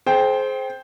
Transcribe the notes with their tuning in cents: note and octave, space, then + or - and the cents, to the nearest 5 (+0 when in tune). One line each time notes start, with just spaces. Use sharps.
G#4 +40 C5 +0 G5 +0